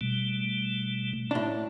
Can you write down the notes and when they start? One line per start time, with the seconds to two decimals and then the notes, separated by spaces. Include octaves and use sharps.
0.01 B2 G3 A3
1.31 A2 D4